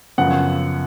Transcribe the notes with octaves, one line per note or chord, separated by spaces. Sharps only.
F#2 C#3 F3 B3 F#5